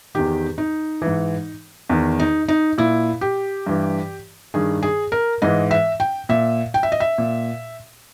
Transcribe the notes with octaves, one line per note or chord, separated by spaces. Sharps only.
E2 D#3 G4
D#4
G#2 E3
E2 D#3
D#4
D#4
A#2 E4
G4
G2 E3
G2 D#3 G#4
G#4
A#4
G#2 E3 D#5
E5
G5
A#2 E5
G5
E5
D#5
E5
A#2